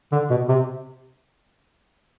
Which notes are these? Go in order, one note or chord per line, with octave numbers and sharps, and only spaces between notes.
D3
B2
C3